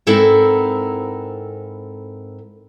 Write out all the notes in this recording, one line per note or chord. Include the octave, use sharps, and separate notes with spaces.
G#2 C4 E4 A4 A#4 F#5